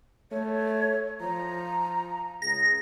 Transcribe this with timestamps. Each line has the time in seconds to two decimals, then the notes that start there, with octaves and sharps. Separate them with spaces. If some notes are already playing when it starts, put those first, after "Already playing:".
0.31 A3 C#5
1.21 F3 A#5
2.42 C#2 G#4 A#6